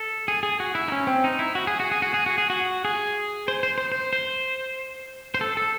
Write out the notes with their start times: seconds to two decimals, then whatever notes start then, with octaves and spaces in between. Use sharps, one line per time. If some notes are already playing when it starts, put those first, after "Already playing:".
Already playing: A4
0.28 G#4
0.43 G#4
0.60 F#4
0.75 E4
0.88 D#4
0.92 C#4
1.07 C4
1.24 D#4
1.39 E4
1.55 F#4
1.67 G#4
1.80 F#4
1.91 G#4
2.02 F#4
2.14 G#4
2.26 F#4
2.38 G#4
2.50 F#4
2.85 G#4
3.48 C5
3.63 C5
3.78 C5
3.92 C5
4.13 C5
5.34 C5
5.41 A4
5.57 A4